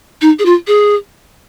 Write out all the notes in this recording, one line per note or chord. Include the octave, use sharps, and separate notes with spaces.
D#4
G#4
F4
G#4